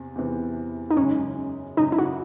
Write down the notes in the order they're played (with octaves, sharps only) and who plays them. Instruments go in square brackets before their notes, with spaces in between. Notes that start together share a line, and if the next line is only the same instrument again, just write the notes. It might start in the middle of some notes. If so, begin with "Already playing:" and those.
Already playing: [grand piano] E2 C3
E2 C3 E3
[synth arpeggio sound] D#4
[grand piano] F#2 C#3 G#3 [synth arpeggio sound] C#4
[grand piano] F#2 C#3 G#3 [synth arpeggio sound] D#4
[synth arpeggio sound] E4
F#4